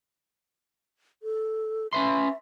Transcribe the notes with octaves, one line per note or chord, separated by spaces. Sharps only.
A4
C#4 B4 E5 C6